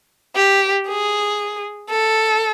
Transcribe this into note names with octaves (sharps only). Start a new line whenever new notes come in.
G4
G#4
A4